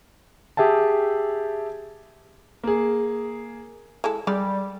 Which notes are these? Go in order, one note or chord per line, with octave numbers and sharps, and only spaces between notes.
G4 G#4 E5 G5 A5
A#3 G#4
G#3 E4 A4
G3 G#3 D5